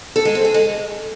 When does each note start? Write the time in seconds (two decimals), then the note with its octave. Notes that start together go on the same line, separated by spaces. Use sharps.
0.16 A4
0.25 G#3
0.35 C4
0.45 G#4
0.54 G#3